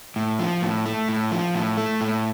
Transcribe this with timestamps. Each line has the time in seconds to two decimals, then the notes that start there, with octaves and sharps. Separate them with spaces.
0.16 A2
0.39 F3
0.62 A2
0.86 A3
1.09 A2
1.32 F3
1.55 A2
1.77 A3
2.01 A2